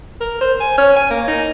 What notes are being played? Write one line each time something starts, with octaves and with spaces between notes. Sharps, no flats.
A#4
C5
G#5
C#4
G#5
A#3
D#4